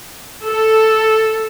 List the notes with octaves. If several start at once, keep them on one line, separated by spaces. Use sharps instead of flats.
A4